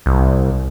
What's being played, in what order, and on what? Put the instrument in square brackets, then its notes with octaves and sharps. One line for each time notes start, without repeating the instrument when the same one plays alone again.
[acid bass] C2